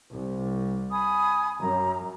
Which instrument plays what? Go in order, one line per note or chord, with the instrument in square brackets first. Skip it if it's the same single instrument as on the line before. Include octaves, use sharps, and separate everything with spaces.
[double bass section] C2
[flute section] G#5 B5 D#6
[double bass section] F#2 [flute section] A#5